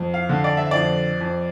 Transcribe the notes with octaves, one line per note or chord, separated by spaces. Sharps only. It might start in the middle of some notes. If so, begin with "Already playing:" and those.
Already playing: F2
F5
D3
D5
E5
F2 D5
F2